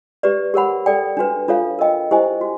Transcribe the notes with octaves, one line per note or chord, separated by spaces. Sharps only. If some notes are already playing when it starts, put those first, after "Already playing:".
G4 B4 D5
G4 A#4 C#5 F#5 B5
A4 D5 G5
D4 F#4 B4
D4 F4 A4 C#5 F5
A#4 D#5 G5
E4 G4 C5 D#5 G#5
F#4